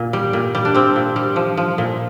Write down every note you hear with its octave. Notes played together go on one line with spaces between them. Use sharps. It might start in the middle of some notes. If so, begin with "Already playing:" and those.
Already playing: A#2
G3
A#2
G3
D4
G3 C4
A#2
G3
F3
F3
A#2